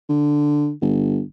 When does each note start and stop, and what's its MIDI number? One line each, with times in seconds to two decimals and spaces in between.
0.09 0.71 50
0.82 1.21 31